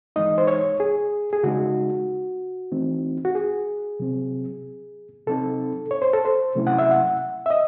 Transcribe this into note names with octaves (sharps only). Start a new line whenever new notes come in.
E3 G#3 D#4 D#5
C5
C#5
G#4
G#4
C#3 G#3 D#4 F#4
E3 A3 C4 D#4
F#4
G#4
C3 F#3 C4
C3 F#3 C4 D#4 A4
C#5
C5
A4
C5
C3 F#3 A3 C#4 E4
F#5
E5
F#5
E5
D#5